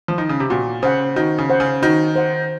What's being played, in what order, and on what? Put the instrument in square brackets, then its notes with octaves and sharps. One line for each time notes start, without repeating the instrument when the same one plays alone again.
[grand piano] F3
D#3
C#3
C3
[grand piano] A#2 [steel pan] F#4
[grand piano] C#3 [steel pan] C5 F#5
[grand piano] D#3 [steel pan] F#4
[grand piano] C#3
[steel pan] C5 F#5
[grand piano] C#3
[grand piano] D#3 [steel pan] F#4
[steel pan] C5 F#5